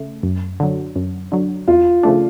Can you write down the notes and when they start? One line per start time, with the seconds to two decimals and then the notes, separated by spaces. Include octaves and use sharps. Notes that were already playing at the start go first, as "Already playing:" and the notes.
Already playing: C#3 A3
0.23 F#2
0.60 D3 F#3
0.96 F#2
1.32 D3 F#3
1.68 E2 F4
2.03 C#3 F3 A3 D4